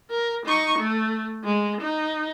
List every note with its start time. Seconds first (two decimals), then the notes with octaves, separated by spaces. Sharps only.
0.10 A#4
0.45 D#4 C#6
0.78 A3
1.44 G#3
1.81 D#4